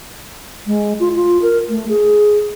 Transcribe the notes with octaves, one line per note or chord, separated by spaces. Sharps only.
G#3
F4
F4
A#4
A3
G#4